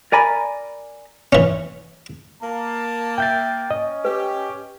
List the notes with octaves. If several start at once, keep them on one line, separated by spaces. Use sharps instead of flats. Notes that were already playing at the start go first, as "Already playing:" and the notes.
A#4 D5 G#5 A#5 B5
E3 C#4
A#3 A5
E5 G5 G6 A6
C#4 D#5
G4 B4